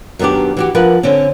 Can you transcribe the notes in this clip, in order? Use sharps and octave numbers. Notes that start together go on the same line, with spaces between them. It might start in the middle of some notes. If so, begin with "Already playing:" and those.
F#2 D#3 B3 D4 G4
E3 F#4 G4
F3 A#4 B4 F#5
D3 C4 C#4